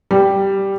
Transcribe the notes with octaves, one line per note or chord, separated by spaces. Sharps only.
G3